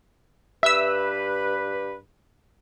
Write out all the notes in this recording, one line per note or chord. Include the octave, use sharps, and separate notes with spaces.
G2 G4 B4 E5 E6